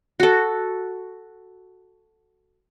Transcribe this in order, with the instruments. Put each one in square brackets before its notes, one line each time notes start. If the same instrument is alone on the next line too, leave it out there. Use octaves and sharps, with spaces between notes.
[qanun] F#4 A4